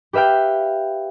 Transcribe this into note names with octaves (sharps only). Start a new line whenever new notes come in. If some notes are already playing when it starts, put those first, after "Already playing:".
G4 B4 E5 F5 G5